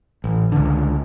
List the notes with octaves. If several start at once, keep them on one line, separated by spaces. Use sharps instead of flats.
A1
C#2 D3